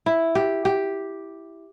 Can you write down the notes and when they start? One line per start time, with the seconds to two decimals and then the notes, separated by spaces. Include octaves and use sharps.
0.06 E4
0.35 G4
0.65 G4